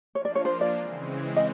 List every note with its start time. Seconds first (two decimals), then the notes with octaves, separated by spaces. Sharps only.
0.14 F3 A#3 D4 F4 C#5
0.25 D5
0.35 C#5
0.45 C5
0.61 D5
0.75 C#3 E3 G#3 C4
1.36 D#5